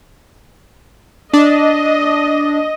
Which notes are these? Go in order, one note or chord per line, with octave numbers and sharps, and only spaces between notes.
D4 D#5